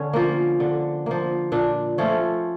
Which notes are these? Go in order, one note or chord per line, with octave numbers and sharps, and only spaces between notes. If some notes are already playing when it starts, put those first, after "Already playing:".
Already playing: D3 C#4
F3 A#3
D3
F3 A#3
A#2 D4
F3 A3 C#4